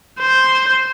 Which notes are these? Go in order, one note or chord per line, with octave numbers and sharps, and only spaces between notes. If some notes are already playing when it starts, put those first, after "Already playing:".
C5